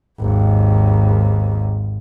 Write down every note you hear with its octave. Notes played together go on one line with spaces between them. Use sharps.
G#1 D#2